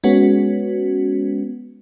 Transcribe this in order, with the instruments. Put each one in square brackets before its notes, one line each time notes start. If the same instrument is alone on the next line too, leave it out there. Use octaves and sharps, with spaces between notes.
[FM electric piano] G#3 B3 C#4 F#4